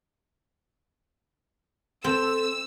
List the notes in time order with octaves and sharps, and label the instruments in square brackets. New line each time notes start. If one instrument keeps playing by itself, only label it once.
[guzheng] C4 [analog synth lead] A4 [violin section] E6